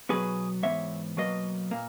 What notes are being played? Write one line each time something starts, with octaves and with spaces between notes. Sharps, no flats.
B2 F#3 B3 G#4 B4
G#2 E3 B3 C#5 E5
B2 F#3 A#3 B4 D#5
A#2 A#3